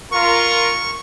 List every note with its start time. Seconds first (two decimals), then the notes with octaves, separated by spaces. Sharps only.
0.12 F4 A#4 C#6